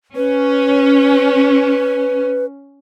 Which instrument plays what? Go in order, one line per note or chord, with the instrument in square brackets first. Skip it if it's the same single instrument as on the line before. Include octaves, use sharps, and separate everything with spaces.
[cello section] C#4 [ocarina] B4